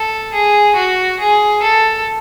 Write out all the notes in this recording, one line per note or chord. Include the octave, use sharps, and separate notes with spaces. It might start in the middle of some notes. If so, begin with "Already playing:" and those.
Already playing: A4
G#4
F#4
G#4
A4